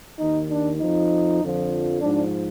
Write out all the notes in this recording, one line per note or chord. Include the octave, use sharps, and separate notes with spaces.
D#2 D#3 D#4
D4
F2 F3 D#4
F2 D3 F3
G#2 F3 D4